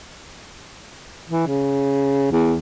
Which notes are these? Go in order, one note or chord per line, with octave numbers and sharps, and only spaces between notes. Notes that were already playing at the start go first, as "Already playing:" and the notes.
E3
C#3
E2